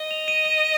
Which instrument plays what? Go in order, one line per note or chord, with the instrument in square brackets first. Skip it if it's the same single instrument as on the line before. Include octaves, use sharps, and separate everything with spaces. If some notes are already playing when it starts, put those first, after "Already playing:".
Already playing: [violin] D#5
[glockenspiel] F7
D#7
D#7